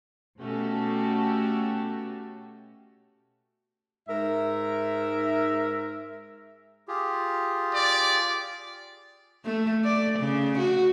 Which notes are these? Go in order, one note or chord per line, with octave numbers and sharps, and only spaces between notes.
B2 A3 C#4 F#4 G4 A4
G#2 A#4 E5
F4 G4 G#4
D5
A3
D5
C#3
F#4